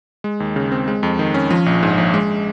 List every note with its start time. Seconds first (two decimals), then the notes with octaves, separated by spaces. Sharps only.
0.24 G#3
0.40 D#2
0.56 C#3
0.72 C4
0.88 G#3
1.03 F2
1.19 D#3
1.34 C#4
1.51 F3
1.66 A#1
1.83 G#2
1.98 A#1
2.14 G#3